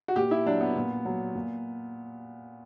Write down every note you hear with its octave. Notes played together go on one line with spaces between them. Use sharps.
F#4
A#2 G4
E4
F#3 D4
B3
A#2
F#3
A#2